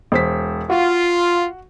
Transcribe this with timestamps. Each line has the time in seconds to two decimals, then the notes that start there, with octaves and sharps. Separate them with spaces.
0.12 E1 C5 B6
0.70 F4 F#4